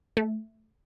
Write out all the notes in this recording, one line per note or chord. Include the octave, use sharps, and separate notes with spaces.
A3